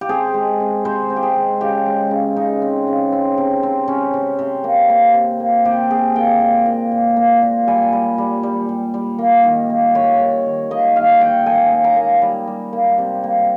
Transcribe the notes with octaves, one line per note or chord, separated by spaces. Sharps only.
G4
C4 G#4
G#3
C4
C3 C5
C4
G4
G#4
G#3
C#3 G4
G#3
C#3
C#3 D#4
C4
C#3
C4
C3
C4
C3 C#4
C3
C3
A#3
A#3
C3
A#3
C3 G4
C3 G#4
A#3 G5
A#2
A#2
A#2
A#3
A#2
G3 G#5
G3
G3
G3
G3
G3
A#3
D#3
A#3
A#3 C#5
D#3
D#3
A#3 D#5
D#3 F5
D#3 G5
A#3 G#5
A#3
A#5
A#3
G3
G3
A#3
C3
A#3